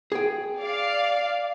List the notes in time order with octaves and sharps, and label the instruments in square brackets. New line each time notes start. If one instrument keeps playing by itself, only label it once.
[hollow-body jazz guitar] G#4 G5
[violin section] D5 F5